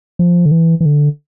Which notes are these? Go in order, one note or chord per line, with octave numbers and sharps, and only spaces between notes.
F3
D3
E3
E3
D3